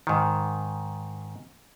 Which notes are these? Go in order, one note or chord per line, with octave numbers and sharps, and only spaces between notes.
G#2 D#3